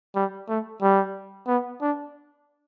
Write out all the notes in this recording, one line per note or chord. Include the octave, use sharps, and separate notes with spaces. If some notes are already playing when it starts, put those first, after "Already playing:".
G3
A3
G3
B3
D4